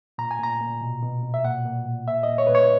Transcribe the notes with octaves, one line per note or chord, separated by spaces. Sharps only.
A#2 A#5
G#5
A#2 A#5
A#2
B2
B2
B2
E5
A#2 F#5
A#2
A#2
A#2 E5
A#2 D#5
C#5
A#2 B4
C#5